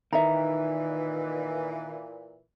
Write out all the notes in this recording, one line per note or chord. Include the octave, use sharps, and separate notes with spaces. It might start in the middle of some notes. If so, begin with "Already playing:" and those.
A#2 D#3 E3 E5 A#5